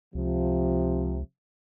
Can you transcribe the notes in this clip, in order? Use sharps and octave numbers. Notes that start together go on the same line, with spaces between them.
C#2 C3 F3